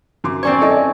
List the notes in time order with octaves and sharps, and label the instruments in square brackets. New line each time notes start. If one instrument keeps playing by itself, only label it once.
[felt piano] F#2 C6 D6
[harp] C4 C#4 C#5 [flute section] D5
[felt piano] E4 A4 D#5